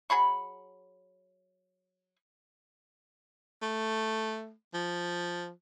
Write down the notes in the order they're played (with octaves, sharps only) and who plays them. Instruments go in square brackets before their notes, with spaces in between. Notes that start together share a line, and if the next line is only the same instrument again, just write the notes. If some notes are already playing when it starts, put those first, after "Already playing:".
[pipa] F#3 G#4 B5 C#6
[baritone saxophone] A3
F3